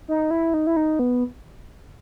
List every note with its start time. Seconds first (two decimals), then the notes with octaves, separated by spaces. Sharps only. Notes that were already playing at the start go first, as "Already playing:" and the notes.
0.08 D#4
0.31 E4
0.54 D#4
0.67 E4
0.76 D#4
0.99 B3